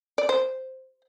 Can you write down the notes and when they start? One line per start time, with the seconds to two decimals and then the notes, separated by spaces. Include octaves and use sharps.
0.18 D5
0.29 C5